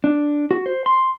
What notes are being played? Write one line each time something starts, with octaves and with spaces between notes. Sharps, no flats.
D4
F#4
C5
C6